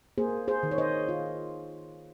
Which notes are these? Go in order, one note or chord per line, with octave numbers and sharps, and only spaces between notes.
A#3 G#4 C5
G#4 C5
D#3
C#5
C5 D#5
F4